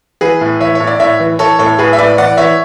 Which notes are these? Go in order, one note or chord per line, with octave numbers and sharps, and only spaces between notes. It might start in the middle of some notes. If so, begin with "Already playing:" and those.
E3 G#4 B4
A2
E3 C#5 E5
A2 C#5
D5
A2 C#5 E5
E3
E3 A4 C#5
A2 A4 C#5
A2 G#4 B4
E5
A2 B4 D5
E3 D5 F#5
E3 C#5 E5